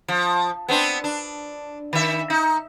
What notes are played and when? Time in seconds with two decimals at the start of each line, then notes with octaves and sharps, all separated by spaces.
0.08 F3
0.68 B3 C4 D4
1.04 D4
1.93 D#3 E5
2.30 D#4